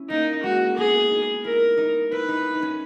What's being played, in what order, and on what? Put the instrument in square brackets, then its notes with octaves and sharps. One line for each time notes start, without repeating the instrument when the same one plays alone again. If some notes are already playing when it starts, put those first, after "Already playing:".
Already playing: [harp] C#4 E4
[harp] A#3 [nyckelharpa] D#4
[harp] G#3 [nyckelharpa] F#4
[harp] B3 [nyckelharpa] G#4
[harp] D#4
[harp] E4 [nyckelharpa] A#4
[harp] D#4
[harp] E4 [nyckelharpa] B4
[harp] D#4
D#4
C#4